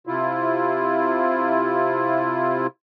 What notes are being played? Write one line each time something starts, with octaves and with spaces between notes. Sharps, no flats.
C3 E4 F4